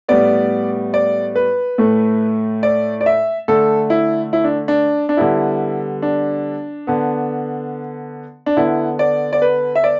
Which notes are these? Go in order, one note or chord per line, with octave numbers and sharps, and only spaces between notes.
A2 G3 B3 D5
D5
B4
A2 A3
D5
D5
E5
D3 A3 A4
E4
E4
D4
D4
D4
D3 G3 B3 E4
D4
D3 B3
D4
D3 B3 E4
D5
D5
B4
E5
D5